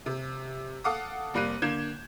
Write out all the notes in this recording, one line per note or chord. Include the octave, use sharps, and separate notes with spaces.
C3
A4 F5 F#5 D6 D#6
F1 G3 A#3 F#6 D#7
D3 A#3 G6 G#6 E7